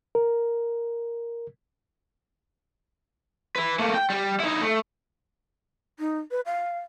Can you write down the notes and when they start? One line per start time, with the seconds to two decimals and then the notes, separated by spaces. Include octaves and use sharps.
0.15 A#4
3.56 E4 B4
3.79 A3 A#3
3.94 G5
4.10 G3
4.40 D#4 E4
4.62 A3
5.99 D#4
6.31 B4
6.46 F5